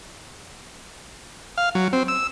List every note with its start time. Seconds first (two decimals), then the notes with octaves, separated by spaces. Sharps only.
1.58 F5
1.75 F#3
1.93 C4
2.08 E6